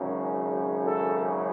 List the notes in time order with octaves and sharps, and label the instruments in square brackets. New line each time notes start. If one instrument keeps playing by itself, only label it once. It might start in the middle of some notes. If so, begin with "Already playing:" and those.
Already playing: [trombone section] G#1 F#2 C#3
A4